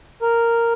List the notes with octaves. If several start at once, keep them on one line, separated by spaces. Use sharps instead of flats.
A#4